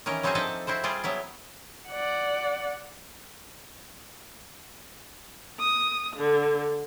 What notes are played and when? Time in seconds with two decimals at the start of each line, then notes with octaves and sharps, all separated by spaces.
0.06 D#3 E3 C#4 A#4
0.23 F#3 G3 C4 D#4 F#4 G#4
0.35 F3 D4 D#4 A4 D#5 E5
0.67 C4 E4 F#4 C5
0.84 G3 F4 G#4 C5 D5
1.04 F#3 B3 E4
1.89 D5 F#5
5.59 D#6
6.16 D3